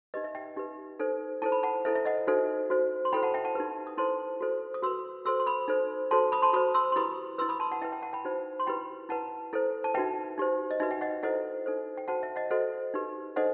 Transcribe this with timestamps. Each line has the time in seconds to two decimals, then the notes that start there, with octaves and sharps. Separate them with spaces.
0.14 D#4 G4 B4 D#5
0.24 E5
0.35 E5 G5
0.57 D#4 G4 B4
0.99 D#4 A4 C5
1.42 E4 A4 C5 A5
1.52 B5
1.63 F#5 A5
1.85 E4 A4 C5 E5
1.95 E5
2.05 D#5 F#5
2.27 D#4 F#4 A4 C5
2.70 F#4 C5
3.05 C6
3.12 E4 A4 C5 G5 B5
3.23 F#5 A5
3.34 E5 G5
3.44 F#5 A5
3.55 D#4 G4 B4
3.87 D#6
3.98 E4 A4 C5 A5 C6
4.41 F#4 A4 C5
4.74 D#6
4.82 F#4 B4 C6 E6
5.25 F#4 A4 C5 C6 E6
5.40 C6
5.46 B5 D#6
5.68 D#4 A4 C5
6.11 F#4 A4 C5 A5 C6
6.32 B5 D#6
6.42 A5 C6
6.53 F#4 C5 B5 D#6
6.74 C6 E6
6.92 C6
6.96 E4 G4 B4 B5 D#6
7.38 E4 B4 C6 E6
7.49 B5 D#6
7.60 A5 C6
7.72 F#5 A5
7.82 E4 B4 E5 G5
7.92 E5 G5
8.02 F#5 A5
8.13 G5 B5
8.25 D#4 F#4 C5
8.60 C6
8.67 E4 G4 B4 G5 B5
9.09 E4 B4 F#5 A5
9.53 E4 A4 C5
9.84 A5
9.94 D#4 F#4 B4 E5 G5
10.38 D#4 G4 C5
10.71 D#5
10.80 D#4 F#4 B4 E5
10.91 E5 G5
11.01 D#5 F#5
11.23 E4 A4 C5 D#5 F#5
11.66 D#4 A4 C5
11.97 G5
12.08 F#4 C5 F#5 A5
12.23 E5
12.36 D#5 F#5
12.50 F#4 A4 C5 D#5 F#5
12.94 D#4 G4 B4
13.36 D#4 A4 C5 D#5 F#5